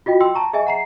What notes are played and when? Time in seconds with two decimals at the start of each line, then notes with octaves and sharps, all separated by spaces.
0.06 F4 F#4 D#5 G5
0.21 G5 C6 E6
0.35 A5 A#5 C#6
0.53 G#4 D#5 E5 G#5
0.66 F#5 A#5 C7